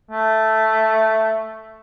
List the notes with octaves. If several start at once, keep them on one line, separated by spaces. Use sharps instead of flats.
A3